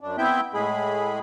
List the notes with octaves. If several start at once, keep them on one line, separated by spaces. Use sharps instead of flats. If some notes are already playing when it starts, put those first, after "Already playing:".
F#2 D4
B3 C4 E4 E5 G5 G6
A2 G#3 G#4 B5